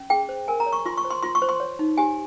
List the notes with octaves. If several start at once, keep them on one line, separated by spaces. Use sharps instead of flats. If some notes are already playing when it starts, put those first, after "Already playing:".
Already playing: C#4
G#4 G5
C5
A#4 G#5
A#5
C#5
C#6
F4 C6
C#6
C5
C6
F4 C6
C#6
C5
C6
C#5
D#4
G4 G#5